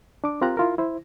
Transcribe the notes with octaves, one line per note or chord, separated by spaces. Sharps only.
D4 D6
C4 F4 G4 A#4 A#5 F#6
E4 F4 A#4
E4 C5